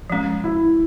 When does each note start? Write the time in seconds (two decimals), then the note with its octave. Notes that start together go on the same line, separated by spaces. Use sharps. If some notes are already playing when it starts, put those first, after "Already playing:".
0.10 F3 G#3 C#4
0.44 E4